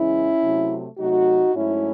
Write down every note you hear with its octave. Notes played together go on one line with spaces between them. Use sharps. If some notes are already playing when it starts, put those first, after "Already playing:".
Already playing: E2 C#3 E3 G#3 C#4 E4
C3 F#3 A3
C3 F#3 A3 D#4 F#4
G#2 F#3 A3 C#4 E4